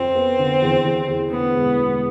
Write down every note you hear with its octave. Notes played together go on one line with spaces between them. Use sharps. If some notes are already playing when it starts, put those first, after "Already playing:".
Already playing: F2 C4
B3
D3
E2
E2
E2
D3 B3
E1
E1